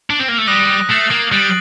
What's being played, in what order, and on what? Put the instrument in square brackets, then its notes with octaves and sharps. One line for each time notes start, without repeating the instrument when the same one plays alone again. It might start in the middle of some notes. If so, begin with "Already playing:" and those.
[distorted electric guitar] D4
C4
A#3
A3
[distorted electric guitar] G3 [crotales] D#6 F#6 A#6 D#7
[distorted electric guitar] A3 [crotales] A6 C7 F#7
[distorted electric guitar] A#3
[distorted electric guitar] G3 [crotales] F#6 A6 D7 F#7